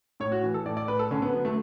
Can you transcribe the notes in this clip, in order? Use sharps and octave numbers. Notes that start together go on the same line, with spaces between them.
A2 C#5
F#4
E3
A4
A2 D5
D5
A2 B4
A4
D3 C#4
B3
F#3 B3
A3